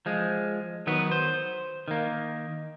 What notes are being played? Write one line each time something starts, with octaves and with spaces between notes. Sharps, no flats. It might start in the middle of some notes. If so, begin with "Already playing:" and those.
F3 G#3
D#3 F#3 B3 B4
C5
D#3 A#3